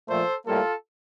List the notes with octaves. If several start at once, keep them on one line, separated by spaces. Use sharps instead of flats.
A#2 F3 A3 A4 C5
A2 G3 A#3 F4 A4